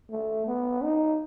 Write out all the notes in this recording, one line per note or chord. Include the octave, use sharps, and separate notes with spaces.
A3
B3
D#4